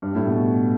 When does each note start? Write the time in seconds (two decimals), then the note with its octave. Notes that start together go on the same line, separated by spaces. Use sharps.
0.02 G2
0.15 A2
0.27 B2